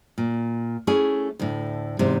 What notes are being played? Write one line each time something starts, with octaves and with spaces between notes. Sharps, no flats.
A#2
A3 C#4 E4 G#4
D2 A2
E2 G#2 C3